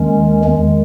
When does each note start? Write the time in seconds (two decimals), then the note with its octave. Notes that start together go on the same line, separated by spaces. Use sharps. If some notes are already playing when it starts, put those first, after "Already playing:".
Already playing: D#2 D#3 G#3 C#4
0.45 E2 D#3 G#3